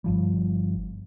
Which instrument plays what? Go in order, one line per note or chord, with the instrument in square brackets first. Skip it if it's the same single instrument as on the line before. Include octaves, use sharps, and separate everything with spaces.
[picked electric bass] G1 F3 G3